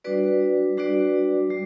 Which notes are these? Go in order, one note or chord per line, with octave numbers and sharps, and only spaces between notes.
G3 D4 F#4 B4 D5
G3 D4 F#4 B4 D5
G3